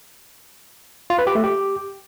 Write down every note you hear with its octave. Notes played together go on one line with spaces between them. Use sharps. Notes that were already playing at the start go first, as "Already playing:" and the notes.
F4
B4
G4
A3
G4